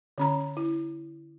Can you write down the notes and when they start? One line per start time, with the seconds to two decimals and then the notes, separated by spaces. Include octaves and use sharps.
0.18 D3 C#4 A#5
0.57 E4